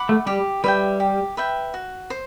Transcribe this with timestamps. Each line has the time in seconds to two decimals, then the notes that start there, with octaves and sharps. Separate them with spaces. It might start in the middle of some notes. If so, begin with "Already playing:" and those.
Already playing: F#5 B5 D6
0.09 A3
0.26 G3 G4
0.64 G3 B4 E5 G5
1.00 G4
1.37 B4 E5 G5
1.74 F#4
2.10 C5